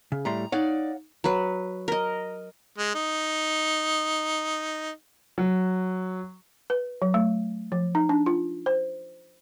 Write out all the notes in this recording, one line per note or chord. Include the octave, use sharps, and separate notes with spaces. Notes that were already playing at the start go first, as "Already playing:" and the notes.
C#3
A2 G3 A#5 C6
D#4 C#5 D5 F5 F#5
F#3 B4
A#4 D#5
G#3
D#4
F#3
B4
F#3
A3
F3
D#4
D4
F4
C5